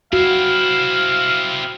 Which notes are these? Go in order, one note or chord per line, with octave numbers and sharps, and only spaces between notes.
C4 E4 F#4 F5